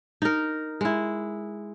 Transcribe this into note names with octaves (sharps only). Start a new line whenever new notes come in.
D#4 A#4
G#3 E4